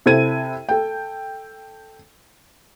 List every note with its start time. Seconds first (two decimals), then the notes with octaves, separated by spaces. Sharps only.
0.06 C3 E4 A4 C5 G#6 D#7
0.69 A4 G5